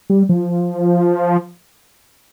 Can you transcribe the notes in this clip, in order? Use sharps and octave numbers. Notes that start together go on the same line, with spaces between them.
G3
F3